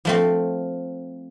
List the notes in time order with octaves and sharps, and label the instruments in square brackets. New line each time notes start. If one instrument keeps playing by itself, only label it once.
[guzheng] F3 A3 C4